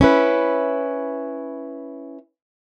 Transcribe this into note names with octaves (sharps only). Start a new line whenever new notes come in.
C#4 E4 B4